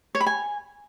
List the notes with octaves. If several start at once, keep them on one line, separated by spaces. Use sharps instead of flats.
C#5
B5
G#5